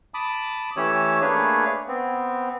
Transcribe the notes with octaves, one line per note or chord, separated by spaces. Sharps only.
A5 B5 D6 D#6
E3 A3 C#4 G4 C#5 E6
A3 A#3 D4 G#4 B4 C#5
B3 C4